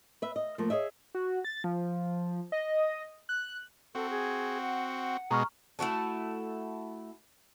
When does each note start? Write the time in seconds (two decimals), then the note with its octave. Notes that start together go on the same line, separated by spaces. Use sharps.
0.22 B4 E5
0.36 D#5
0.58 F3 A3 A#3
0.70 G#4 C#5 D#5 E5
1.15 F#4
1.44 A6
1.64 F3
2.52 D#5
3.29 F#6
3.95 C4 F#4 A4
4.10 G#4
4.61 F#5
5.31 B2 G#3 A#5 C#6 F6
5.79 A3 E4 F#4 A4